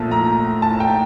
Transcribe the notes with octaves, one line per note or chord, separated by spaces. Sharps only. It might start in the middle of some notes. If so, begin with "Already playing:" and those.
Already playing: A#1 A#2 A3
A#5
A5
G5